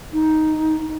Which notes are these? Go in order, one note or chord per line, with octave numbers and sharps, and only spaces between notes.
D#4